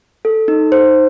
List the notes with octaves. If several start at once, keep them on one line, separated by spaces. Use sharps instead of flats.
A4
D#4
C5